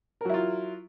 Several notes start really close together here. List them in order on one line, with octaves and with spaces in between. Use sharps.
A#4 F#3 E4 F4